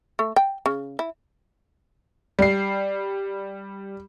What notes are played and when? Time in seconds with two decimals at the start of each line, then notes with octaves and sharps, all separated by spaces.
0.19 A3
0.36 G5
0.66 C#3
0.99 E4
2.39 G3 C7